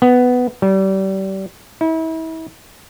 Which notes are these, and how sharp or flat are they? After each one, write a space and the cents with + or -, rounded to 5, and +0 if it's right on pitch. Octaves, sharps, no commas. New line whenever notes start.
B3 +10
G3 -30
E4 -35